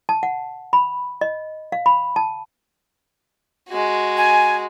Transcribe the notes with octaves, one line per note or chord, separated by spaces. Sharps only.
A5
F#5
B5
D#5
F5
B5
A5
G#3 F#4
G#5